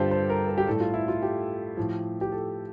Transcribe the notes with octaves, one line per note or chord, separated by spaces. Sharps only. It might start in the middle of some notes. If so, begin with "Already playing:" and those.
Already playing: G2 D3 G3 F4 G4 A4 C5
C5
A#4
A#4
G4
A2 G3 A4
F4
E4
F4
G4
A2 F3
G4
A4